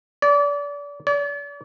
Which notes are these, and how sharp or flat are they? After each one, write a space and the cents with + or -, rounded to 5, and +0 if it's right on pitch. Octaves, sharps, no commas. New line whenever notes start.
D5 -30
D5 -40